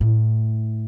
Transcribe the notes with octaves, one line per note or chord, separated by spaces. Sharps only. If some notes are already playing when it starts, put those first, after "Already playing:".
A2